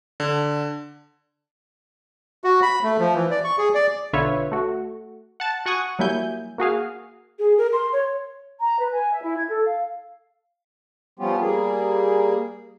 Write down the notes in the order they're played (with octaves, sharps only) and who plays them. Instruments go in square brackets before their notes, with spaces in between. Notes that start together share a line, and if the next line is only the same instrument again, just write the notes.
[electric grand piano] D3
[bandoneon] F#4
B5
A3
F3
E3
D5
C#6
G#4
D5
[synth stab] B1 D3 F4 B4 C#5 E5
A3 F#4
F#5 A5 A6
F#4 F#5 G#5 C#6 D#6
F#3 G3 A#3 E4 G#5 G6
A#3 F#4 G#4 F5
[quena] G#4
A#4
C6
C#5
[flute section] A#5
B4
G#5
E5
E4
G#6
A4
F5
[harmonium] F3 G3 B3 C#4 F4 G4
G3 A#3 G#4